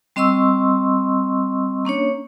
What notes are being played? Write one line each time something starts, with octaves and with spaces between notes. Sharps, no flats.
G3 C4 D#5 C6 C#6 E6
A#3 C#4 D4 C#5